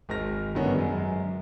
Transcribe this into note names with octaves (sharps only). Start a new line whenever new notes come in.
G#1 G#3 F6 A#6
G2 D3 D#3 B3 C#4
F#2 G#3